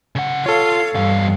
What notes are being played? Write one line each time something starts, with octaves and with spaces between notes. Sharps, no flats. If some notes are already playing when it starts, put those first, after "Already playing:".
C#3 F#5
F4 A4 C#5 F5
E2 G2 F5